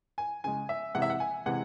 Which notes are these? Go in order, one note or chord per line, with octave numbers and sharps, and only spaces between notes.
G#5
C#3 G#3 G#5
E5
C3 E3 G#3 F#5
E5
F#5
G#5
C3 E3 G#3 F#5